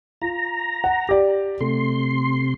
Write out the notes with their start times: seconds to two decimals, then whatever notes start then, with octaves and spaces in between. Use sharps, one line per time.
0.22 F4 A#5
0.84 F#5
1.09 G4 D5
1.61 C3 A3 C6